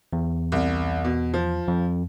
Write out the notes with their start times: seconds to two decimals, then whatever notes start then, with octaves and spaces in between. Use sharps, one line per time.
0.13 E2
0.52 C2
1.04 B2
1.34 F3
1.68 F2